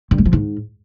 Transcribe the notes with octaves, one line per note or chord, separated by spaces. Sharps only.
G2
G#3
F3
G#2